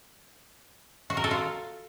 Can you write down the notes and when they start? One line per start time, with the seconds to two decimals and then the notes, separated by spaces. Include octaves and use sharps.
1.10 F#4
1.17 A#4
1.24 A4
1.31 F4